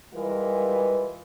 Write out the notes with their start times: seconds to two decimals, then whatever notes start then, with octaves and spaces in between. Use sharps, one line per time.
0.14 E3 G3 G#3 F4 A#4 B4